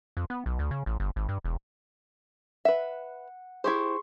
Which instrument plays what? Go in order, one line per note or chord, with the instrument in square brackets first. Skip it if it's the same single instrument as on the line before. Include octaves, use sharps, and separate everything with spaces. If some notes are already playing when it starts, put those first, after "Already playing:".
[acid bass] F2
B3
B1
D2
C#3
A1
G1
G#1
G2
E1
[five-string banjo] B4 E5 [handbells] F#5
[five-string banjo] E4 G4 C5 [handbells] G#4 C6 C#6